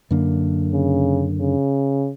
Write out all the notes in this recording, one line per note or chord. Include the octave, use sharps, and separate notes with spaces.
F#2 D3 A#3
C#3
C#3